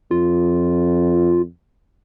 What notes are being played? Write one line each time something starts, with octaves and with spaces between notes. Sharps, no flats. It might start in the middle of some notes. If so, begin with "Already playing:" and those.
F2 F4